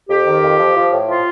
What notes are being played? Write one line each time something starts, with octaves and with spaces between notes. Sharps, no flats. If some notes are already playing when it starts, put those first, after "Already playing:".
F2 G4
D#3
F2
F3
F3
A2
F3 F4